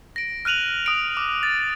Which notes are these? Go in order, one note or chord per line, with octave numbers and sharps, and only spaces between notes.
A#6 D7
F6 F#6 D#7 F7 F#7
D#6 D7
D6
A6